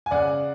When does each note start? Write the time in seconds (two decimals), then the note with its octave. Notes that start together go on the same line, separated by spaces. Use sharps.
0.06 G#5
0.11 C#3 D5 F#5